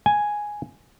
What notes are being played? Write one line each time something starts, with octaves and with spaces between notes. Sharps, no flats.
G#5